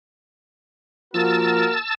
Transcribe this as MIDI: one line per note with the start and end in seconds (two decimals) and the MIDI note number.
1.14 1.66 53
1.14 1.76 58
1.14 1.76 66
1.14 1.76 70
1.14 1.95 81
1.14 1.95 88
1.14 1.95 93